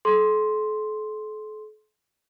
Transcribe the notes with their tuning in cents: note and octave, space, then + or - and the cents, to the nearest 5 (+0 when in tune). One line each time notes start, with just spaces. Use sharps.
A4 -45 C6 +0